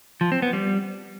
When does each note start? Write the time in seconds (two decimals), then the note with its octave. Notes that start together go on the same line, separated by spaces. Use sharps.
0.21 F3
0.32 C4
0.42 B3
0.53 G3